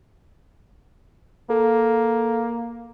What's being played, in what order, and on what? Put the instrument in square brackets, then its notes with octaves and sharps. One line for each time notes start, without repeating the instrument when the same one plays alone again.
[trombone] A#3 [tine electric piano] A4